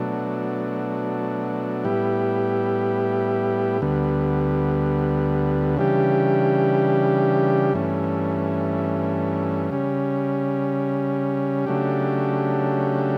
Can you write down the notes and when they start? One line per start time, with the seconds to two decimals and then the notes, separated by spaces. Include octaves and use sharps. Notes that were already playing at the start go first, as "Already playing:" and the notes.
Already playing: B2 F#3 A3 D4
1.85 A2 G3 B3 E4 G4
3.81 D2 D3 G3 B3
5.77 C#3 E3 G3 D4 G4
7.74 G2 E3 A3 C#4
9.70 C#3 G3 C#4
11.66 C#3 F#3 A3 D4 G4